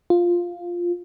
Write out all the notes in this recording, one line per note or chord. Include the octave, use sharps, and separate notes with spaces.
F4